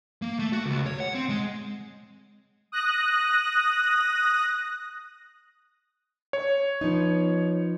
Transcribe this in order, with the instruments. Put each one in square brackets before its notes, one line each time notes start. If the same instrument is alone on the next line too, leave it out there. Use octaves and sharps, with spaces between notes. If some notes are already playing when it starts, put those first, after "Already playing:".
[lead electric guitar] A#3
A3
F#4
C#2
C#5
F#5
C4
G#3
[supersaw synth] D#6 F#6 A#6
[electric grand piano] C#5
[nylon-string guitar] F3 B3 D#4